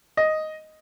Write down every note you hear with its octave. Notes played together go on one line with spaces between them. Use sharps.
D#5